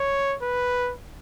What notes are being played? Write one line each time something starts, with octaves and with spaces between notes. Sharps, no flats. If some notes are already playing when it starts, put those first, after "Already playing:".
Already playing: C#5
B4